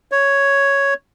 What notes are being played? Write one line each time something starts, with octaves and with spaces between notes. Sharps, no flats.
C#5